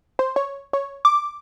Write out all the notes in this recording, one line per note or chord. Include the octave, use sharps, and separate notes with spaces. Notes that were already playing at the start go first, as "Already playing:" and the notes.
C5
C#5
C#5
D6